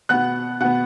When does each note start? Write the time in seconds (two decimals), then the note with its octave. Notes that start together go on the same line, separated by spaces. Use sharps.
0.09 B2 B3 F#5 F#6
0.60 B2 B3 F#5